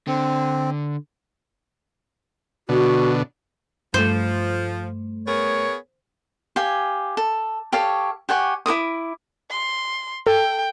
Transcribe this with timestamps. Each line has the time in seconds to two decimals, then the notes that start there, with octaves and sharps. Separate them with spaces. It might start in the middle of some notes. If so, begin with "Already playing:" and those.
0.08 D3 C4
2.69 B2 D3 F#4
3.94 G2 F3 A3 C5
5.27 B3 G#4 A#4 C#5
6.56 G4 F5 G#5
7.17 A4
7.72 G4 A4 C#5 F5
8.29 G4 F#5 G#5 C#6
8.66 E4 A#4 D6 D#6
9.51 C6
10.27 A4 G5